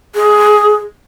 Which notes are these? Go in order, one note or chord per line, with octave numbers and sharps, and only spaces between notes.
G#4